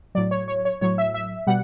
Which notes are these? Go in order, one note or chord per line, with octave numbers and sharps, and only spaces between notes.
A2 F#3 D5
C#5
C#5
C#5
A2 F#3 C#5
E5
E5
B2 G3 F#5